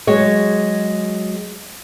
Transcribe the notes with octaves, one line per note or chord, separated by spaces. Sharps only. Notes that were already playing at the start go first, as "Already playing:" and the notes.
F#3 G#3 C#5